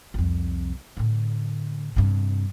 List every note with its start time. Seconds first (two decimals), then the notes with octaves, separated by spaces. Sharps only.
0.14 C2 F2
0.97 A2 D3
1.96 G2 C3